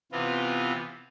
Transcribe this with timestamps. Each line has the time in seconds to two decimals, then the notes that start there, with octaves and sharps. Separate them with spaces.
0.12 C3 E3 B3 C4 F4